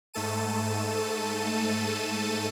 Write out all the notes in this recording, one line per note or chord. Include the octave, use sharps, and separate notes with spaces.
G#2 A3 A4 A5 D#7